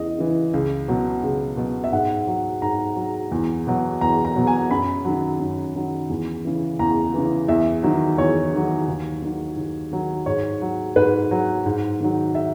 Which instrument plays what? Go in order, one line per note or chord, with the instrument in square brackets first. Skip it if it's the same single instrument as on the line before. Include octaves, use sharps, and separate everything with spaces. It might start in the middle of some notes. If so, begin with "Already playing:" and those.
Already playing: [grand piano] E2 C#3 E3 D#5
C#3 E3
C#2
B2 F#3
C#2
B2 F#3
E5
G#2 F#5
F#3
G#2 A#5
F#3
E2
B2 F#3
E2 A#5
A#5
B2 F#3
G#5
F#2 B5
D#3 F#3
F#2
D#3 F#3
E2
C#3 E3
E2 A#5
C#3 E3
E2 E5
D#3 F#3
E2 C#5
D#3 F#3
D#2
D#3 F#3
D#2
D#3 F#3
G#2 C#5
F#3
G#2 B4
F#3
G#2
D#3 F#3
E5